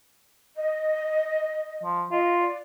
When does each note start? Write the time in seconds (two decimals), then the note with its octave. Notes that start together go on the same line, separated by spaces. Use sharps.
0.56 D#5
1.84 F3
2.11 F4 D#5
2.41 D5